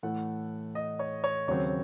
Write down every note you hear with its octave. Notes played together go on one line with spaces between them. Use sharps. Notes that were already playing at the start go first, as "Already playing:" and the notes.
A2 E3 A3 F#5
D#5
C#5
C#5
D#2 C#3 F#3 C4 C#5